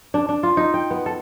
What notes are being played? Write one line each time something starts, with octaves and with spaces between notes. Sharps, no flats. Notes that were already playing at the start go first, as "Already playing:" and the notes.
D4
D4
F4
D#4
G5
B3
A4